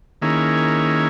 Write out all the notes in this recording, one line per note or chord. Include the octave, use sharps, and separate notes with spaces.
D#3 A#3 C#4 E4 G#4